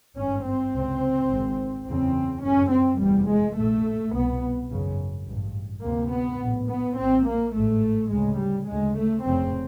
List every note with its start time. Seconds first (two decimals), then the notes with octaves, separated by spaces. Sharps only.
0.17 G#1 G2 C#4
0.45 C4
0.73 C#2 C3
1.30 G#1 G#2
1.86 F#1 E2 C#3 C4
2.43 G1 F#2 C#3 C#4
2.72 C4
3.00 F1 E2 C3 G3
3.29 G#3
3.57 A#1 A2 A3
4.13 C2 B2 B3
4.70 G#1 F#2 C#3
5.27 A1 G2
5.83 D2 C3 A#3
6.12 B3
6.41 A#1 A2
6.69 B3
6.97 A#1 A2 C4
7.26 A#3
7.54 A1 G#2 A3
8.10 D2 C#3 G#3
8.38 G3
8.67 D2 C#3 G#3
8.96 A3
9.24 F1 F2 C#3 C4